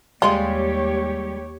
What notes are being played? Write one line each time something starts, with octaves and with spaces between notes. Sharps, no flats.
D#2 G3 G#3 F4 G4 C#5